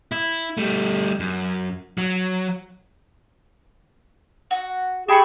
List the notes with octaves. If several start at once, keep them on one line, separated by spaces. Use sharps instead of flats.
E4
G3 A3
F#2
F#3
F#4
G4 G#4 E5 G5 B5 C#6